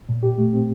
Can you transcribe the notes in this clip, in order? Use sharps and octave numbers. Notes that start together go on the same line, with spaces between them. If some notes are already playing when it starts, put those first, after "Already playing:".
A#2
A#2 G4
A3
C4